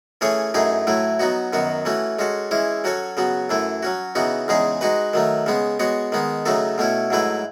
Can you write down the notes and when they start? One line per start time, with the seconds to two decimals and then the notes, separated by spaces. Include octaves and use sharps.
0.21 E3 A3 C#4 G#4 C#5
0.54 F#2 E3 A3 D#4 G#4
0.87 A2 F#3 A3 E4
1.19 F#3 B3 D#4 F#4
1.53 F#2 D#3 F#3 B3 F#4
1.85 E3 A3 C#4 F#4
2.19 G#3 C#4 F#4 A4
2.51 E3 G#3 C#4 E4
2.84 F#3 C#4 F#4 A4 C#5
3.17 C#3 F#3 B3 F#4
3.49 F#2 E3 A3 E4
3.83 F#3 C#4 F#4
4.15 C#3 E3 B3 D#4 F#4
4.48 E2 C#3 G#3 D#4 G#4
4.81 G#3 D#4 F#4 B4
5.13 D#3 F#3 A3
5.46 C#3 G#3 B3
5.79 G#3 B3 F#4 C#5
6.12 D#3 G#3 B3
6.45 C#3 F#3 A3 D#4 A4
6.78 B2 A3 C#4 E4
7.10 G#2 F#3 A3 E4 B4